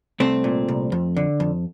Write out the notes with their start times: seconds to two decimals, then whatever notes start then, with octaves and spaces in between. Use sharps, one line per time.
0.20 C2 A3 C4
0.44 A#2
0.68 C2
0.92 F2
1.16 D3
1.40 F2